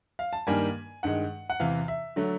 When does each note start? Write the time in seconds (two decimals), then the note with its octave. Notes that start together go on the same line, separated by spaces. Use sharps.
0.19 F5
0.33 A5
0.47 G2 D#3 G3 A#3 G#5
1.03 G2 D#3 G#3 F#5
1.50 F#5
1.60 E2 C3 E3 F5
1.88 E5
2.16 D3 F#3 A3